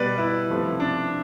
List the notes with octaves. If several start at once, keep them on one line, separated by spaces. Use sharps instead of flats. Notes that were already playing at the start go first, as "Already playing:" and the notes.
Already playing: B2 G3 B4 D5
E4
C3 F3 A3
D4